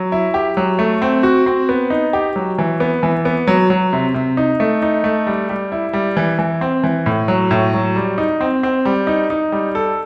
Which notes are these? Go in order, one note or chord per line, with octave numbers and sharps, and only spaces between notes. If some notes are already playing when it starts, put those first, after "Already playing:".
Already playing: F#3
E4
G4
F#3
A3
C4
F#4
C4
B3
D#4
G4
F#3
E3
B3
E3
B3
F#3
F#3
C3
C3
D#4
A3
D#4
A3
G3
G3
E4
G3
E3
E3
C4
E3
A2
F#3
A2
F#3
G3
D#4
C4
C4
G3
D#4
D#4
G3
A4